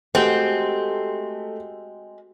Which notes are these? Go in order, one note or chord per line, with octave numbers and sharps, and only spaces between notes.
G#3 A3 C4 F#4 G4